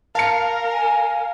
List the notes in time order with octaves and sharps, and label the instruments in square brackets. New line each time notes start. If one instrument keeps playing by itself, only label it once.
[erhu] A#4 [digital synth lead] F5 [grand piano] A5 C#7
[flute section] G#5